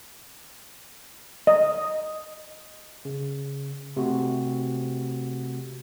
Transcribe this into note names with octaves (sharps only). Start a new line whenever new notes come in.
D#5
C#3
C3 A3 F#4